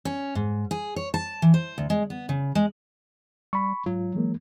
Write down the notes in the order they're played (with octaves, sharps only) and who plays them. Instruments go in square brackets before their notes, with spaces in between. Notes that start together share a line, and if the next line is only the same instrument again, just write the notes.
[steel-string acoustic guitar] C#4
G#2
G#4
C#5
A5
E3
C5
D2
G#3
B3
C#3
G#3
[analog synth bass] G3 [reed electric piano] B5 C#6
[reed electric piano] G#2 F4 [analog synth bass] F#3
[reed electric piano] E3 G#3 A#3